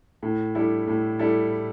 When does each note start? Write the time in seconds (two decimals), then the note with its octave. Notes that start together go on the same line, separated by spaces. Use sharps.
0.23 A2
0.55 G3 E4 A4
0.87 A2
1.19 G3 E4 A4